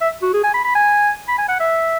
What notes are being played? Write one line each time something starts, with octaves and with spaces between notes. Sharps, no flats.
E5
F#4
G#4
G#5
B5
B5
G#5
B5
G#5
F#5
E5